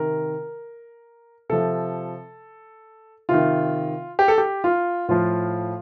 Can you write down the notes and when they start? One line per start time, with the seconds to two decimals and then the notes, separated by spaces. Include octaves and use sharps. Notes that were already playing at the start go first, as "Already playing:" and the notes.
Already playing: C3 D#3 A#4
1.49 C3 F3 A4
3.29 C3 D#3 F4
4.19 G4
4.28 A4
4.38 G4
4.64 F4
5.09 A2 F3 F4